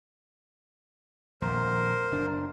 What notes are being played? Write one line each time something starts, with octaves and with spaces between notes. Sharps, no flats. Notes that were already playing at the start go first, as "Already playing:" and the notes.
D#1 A#1 F2 A#4 C5
F#1 D4